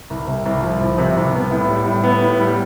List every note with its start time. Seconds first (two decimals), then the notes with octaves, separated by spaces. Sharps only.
0.10 C2
0.27 C3
0.46 C2
0.62 F3
0.80 C2
0.98 C3
1.16 C2
1.34 B3
1.51 A2
1.68 G3
1.86 A2
2.04 B3
2.21 A2
2.40 G3